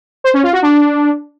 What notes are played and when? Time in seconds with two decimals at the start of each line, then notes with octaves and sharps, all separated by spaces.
0.24 C5
0.34 C#4
0.43 F4
0.53 F#4
0.62 D4